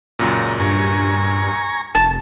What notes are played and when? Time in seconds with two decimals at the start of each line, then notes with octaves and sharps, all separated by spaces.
0.19 C#2 F#2 A#2 A#5
0.60 G2 G#5 A#5 C#6
1.95 F1 A5